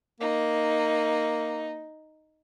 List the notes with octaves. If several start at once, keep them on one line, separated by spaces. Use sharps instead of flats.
A#3 D#4